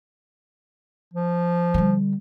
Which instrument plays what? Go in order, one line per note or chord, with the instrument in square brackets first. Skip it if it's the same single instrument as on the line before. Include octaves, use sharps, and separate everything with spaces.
[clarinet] F3
[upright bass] D3 G3